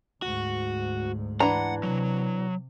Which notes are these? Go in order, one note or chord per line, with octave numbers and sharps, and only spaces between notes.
D2 G#2 F#4
E3 D4 F#5 A#5
C3 F#3